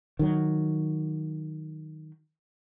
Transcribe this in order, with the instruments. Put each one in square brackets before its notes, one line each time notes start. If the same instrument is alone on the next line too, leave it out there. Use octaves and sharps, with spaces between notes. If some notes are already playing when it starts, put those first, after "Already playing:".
[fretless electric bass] D#3 F#3